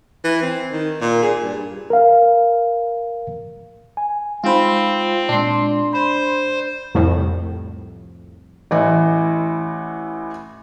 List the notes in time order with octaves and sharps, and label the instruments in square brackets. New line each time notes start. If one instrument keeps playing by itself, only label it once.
[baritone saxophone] E3
C4
D#3
A#2
G#4
G2
[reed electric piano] A#4 F5
G#5
[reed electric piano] G#3 D#4 B5 [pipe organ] C4 [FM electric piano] F4 C5
[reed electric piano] A#2 G#3 [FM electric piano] D4 C6
[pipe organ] C5 [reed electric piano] B5
[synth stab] C2 F2 A2
[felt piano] A1 E3